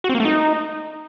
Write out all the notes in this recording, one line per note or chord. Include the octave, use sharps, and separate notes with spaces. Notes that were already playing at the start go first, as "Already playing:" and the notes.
F#4
C4
A#3
A3
D#4